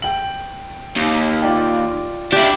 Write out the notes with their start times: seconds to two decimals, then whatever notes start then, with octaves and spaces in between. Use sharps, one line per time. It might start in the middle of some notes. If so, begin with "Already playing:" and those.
0.02 G5 F#7
0.96 D#2
1.42 F4 D5 G5
2.32 D4 E4 G4